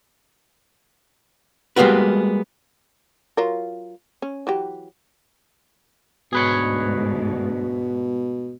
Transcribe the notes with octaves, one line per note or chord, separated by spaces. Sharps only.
G3 G#3 A#3 B3 F#4 B4
F#3 F4 A#4
C#4
E3 F#3 G4
D2 G#2 B2 G#4 B4 C#5